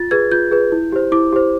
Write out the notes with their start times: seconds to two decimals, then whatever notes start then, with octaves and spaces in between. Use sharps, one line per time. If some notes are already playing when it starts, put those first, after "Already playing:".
Already playing: F4 A6
0.11 G#4 B4 G#6
0.31 F4 G6
0.51 G#4 B4
0.72 E4
0.92 G4 C5
1.12 E4 D6
1.33 G4 C5